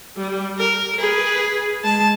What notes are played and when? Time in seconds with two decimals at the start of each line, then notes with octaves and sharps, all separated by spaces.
0.17 G3
0.58 A#4
0.99 G#4 B4
1.84 G#3 A5